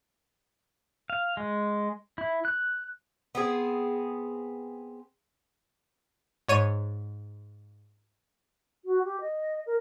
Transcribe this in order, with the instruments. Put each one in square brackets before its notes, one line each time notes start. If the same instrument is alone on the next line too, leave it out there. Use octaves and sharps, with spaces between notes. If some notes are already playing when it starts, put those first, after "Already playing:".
[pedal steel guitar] F5
G#3
E4
F#6
[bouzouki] B3 C4 G#4
[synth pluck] G#2 C#5 D#7
[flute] F#4
G4
D#5
A#4